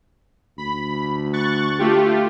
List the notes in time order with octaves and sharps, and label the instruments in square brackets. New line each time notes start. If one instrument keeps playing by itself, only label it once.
[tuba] D2 [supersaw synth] B5
[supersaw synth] C#6 F#6 A6
A3 F4 G4